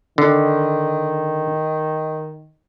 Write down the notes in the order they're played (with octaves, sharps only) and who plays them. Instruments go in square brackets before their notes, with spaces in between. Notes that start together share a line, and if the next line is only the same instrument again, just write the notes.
[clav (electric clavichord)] D3 [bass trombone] D#3